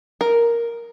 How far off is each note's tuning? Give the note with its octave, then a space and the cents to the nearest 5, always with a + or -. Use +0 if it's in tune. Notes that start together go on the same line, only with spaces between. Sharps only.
A#4 +0